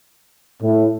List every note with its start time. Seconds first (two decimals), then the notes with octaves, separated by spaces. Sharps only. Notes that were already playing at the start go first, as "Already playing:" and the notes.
0.62 A2